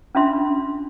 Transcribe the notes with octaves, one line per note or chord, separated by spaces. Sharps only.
C#4 D4 F4 E5 C6